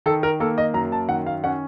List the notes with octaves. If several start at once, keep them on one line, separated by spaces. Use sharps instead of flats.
D#3 A4
A#4
A#3 A4
D#5
F#2 A#5
A5
D#3 F#5
F5
C#4 F#5